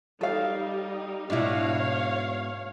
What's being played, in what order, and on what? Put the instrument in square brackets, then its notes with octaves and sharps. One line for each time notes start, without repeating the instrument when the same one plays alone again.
[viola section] G3 D#4 [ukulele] A4 F5
[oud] G#2 B2 [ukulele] D4 E4 [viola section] C#5 F5